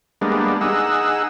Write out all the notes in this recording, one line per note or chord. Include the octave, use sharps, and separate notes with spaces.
G3 G#3 A#3 B3 D4
D#4 G#4 F#5 E6